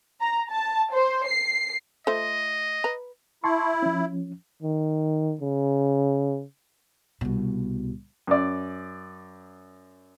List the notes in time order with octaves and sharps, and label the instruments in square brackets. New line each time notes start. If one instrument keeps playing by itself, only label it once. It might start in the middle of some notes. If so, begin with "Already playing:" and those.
[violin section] A#5
A5
C5
C7
[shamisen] A3 F4 C5 [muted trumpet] D#5
[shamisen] B4 A#5
[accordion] E4 [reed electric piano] A5 C6 C#6
[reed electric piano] F3 C#4
[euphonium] D#3
C#3
[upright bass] C2 B2
[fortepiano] F#2 D5